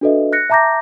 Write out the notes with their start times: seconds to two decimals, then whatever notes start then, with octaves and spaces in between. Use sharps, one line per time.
0.01 D4 F#4 A4 B4 D#5 E5
0.33 F#6 A#6 C#7
0.50 E5 A5 A#5 D6 G6 A#6